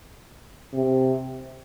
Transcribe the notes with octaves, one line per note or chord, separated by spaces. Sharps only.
C3